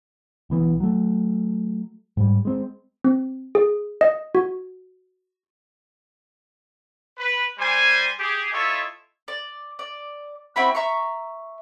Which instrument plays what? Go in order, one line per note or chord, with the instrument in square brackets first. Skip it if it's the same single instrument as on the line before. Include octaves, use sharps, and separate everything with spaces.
[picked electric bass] B1 E3 B3
F#3 A3
G#2 G3
G#3 C4
[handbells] C4
G#4
D#5
F#4
[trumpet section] B4
G3 C5 G#5
G4 G#4
E4 F4 A4 C#5 D#5 E5
[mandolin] D5
D5
C4 E4 F#4 B5
E5 A#5 C#6